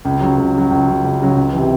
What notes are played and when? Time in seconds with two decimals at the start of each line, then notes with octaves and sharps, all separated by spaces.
0.05 C#2
0.21 C#3 F#3
0.38 C#2
0.55 C#3 F#3
0.70 C#2
0.88 C#3 F#3
1.04 C#2
1.21 C#3 F#3
1.37 C#2
1.53 C3 E3